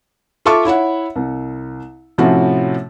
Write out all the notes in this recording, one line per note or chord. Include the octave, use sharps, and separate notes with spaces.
F4 A4 E5 A5 C#6 D6
E4 C#5 E5 F#5
C2
A2 C3 F3 C#4 E4 F#4